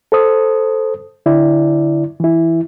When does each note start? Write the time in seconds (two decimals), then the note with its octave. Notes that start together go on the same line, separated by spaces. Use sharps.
0.12 A4 C5 D#6
1.26 D3 E4 D5
2.20 E3 E4